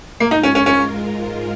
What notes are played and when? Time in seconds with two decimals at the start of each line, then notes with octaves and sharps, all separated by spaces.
0.20 G#2 G#3 A#3 F4 A#4
0.31 D#4
0.43 C#4
0.55 C#4
0.66 C#4